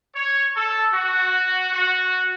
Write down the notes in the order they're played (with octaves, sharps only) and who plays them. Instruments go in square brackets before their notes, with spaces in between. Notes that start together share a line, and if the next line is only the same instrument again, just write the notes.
[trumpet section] C#5
A4
F#4
F#4